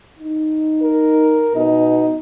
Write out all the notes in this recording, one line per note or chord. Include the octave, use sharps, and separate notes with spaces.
D#4
A#4
B2 D#4